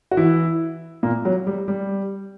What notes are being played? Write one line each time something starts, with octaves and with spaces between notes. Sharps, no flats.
F#4
E3 E4
A#2 A#3
F#3
G3
G3